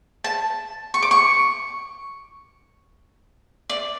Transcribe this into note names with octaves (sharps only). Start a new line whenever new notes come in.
A5
C#6
D6
C#6
D5